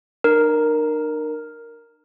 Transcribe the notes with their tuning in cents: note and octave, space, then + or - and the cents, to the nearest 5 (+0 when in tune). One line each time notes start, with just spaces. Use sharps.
D#4 -45 A#4 +0